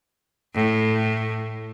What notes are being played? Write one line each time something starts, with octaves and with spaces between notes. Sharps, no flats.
A2